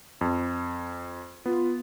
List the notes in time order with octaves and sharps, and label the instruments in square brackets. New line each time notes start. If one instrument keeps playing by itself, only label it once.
[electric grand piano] F2
[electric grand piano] B3 [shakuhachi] F4